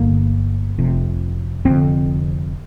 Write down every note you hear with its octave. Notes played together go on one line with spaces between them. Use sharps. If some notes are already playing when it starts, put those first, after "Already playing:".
Already playing: G1 G2 D3 A#3
F1 F2 C3
F1 F2 D3 C4